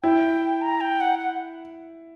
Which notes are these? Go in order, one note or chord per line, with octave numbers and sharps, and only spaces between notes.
E4 G5
A#5
G5
F#5
F#5